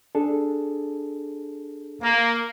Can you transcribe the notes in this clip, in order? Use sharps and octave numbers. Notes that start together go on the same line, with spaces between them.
D4 G#4 A4
A#3